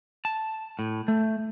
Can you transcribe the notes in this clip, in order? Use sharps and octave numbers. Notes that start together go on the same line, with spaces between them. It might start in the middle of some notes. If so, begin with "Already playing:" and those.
A5
A2
A3